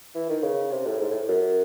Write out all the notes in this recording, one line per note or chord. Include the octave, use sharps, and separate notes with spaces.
E3
D#3
C#3
C3
A2
G#2
A2
F#2